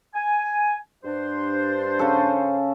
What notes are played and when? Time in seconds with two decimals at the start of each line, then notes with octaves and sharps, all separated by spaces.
0.15 G#5
1.04 G2 D4 C5
1.99 C#3 C#4 A4